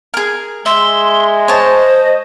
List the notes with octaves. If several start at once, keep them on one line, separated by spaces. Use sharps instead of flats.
G#4 A#4
G#3 E5 C6
C5 C#5 D#5 A5